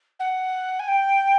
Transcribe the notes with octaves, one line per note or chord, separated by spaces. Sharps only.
F#5
G#5
G5